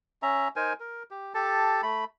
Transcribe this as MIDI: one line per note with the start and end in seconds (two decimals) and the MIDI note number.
0.23 0.48 61
0.23 0.48 76
0.23 0.48 82
0.56 0.73 63
0.56 0.73 70
0.56 0.73 72
0.56 0.73 80
0.80 1.03 70
1.11 1.34 67
1.34 1.81 67
1.34 1.81 69
1.34 1.81 81
1.83 2.05 57
1.83 2.05 83